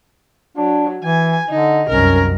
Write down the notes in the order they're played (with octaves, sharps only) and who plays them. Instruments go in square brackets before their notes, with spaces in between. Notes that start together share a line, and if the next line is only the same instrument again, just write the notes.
[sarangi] F#3 [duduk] D4
[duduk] E3 [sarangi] G#5
[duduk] D3 [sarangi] D#4
[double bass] C2 F#2 [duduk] C#4 [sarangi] A#4